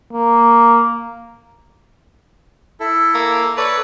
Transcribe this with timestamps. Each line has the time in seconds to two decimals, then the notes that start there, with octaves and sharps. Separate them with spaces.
0.13 A#3
2.80 E4 A4
3.15 A#3
3.57 A4 B4 C#5 D5